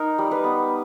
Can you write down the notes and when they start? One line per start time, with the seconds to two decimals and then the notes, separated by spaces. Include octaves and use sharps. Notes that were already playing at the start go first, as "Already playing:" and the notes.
Already playing: D#4 A#4
0.18 G3
0.31 B4
0.44 B3